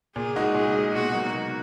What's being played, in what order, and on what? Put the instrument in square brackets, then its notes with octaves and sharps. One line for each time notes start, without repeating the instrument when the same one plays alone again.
[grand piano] A#2 [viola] G#4
[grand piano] G#3 D#4 F#4
[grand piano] A#2 [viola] G#4
[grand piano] G#3 D#4 F#4
[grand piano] B2 [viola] F#4
[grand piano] F#3 A#3 D#4
B2